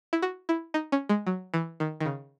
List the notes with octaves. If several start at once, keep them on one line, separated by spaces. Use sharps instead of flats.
E4
F#4
E4
D#4
C#4
G#3
F#3
E3
D#3
D#3
C#3